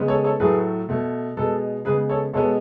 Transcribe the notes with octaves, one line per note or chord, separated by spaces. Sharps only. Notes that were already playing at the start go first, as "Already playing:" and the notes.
Already playing: C#3 G#3 B3
A4 C#5
A4 C#5
A2 F#3 A3 G#4 B4
B2 A3
B2 G#3 B3 A4
C#3 G#3 B3 G#4 B4
A4 C#5
B2 G#3 B3 A4 C#5